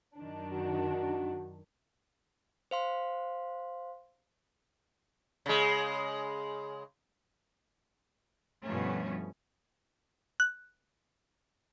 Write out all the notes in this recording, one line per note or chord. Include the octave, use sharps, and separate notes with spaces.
F#2 D#3 D4
F#4
C5 F5 C6
C#3 G#3
G2 B2 F3 A3 C#4
F#6